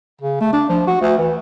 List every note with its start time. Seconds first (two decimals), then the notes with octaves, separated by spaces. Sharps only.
0.21 C#3
0.41 A3
0.53 D4
0.69 F3
0.87 F#4
1.01 D2
1.18 E3